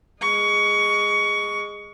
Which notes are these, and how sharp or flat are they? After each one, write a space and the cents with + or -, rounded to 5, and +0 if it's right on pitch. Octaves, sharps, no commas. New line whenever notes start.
G#3 -10 C#6 +20